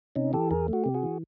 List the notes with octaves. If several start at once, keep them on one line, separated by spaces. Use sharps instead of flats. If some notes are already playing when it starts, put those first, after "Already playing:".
C3 C#4 D#4
E3 G4 A4
E2 G#4 A#4
A3
F#4
C3 G4
F#4 G#4
E3